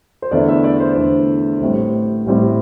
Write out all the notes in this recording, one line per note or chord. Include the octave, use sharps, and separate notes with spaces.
C5
E2 D3 A3 E4 D5
E5
D5
C5
E2 D3 A3 E4 C5
A1 A2 G3 C4 E4
A1 A2 G3 C4 E4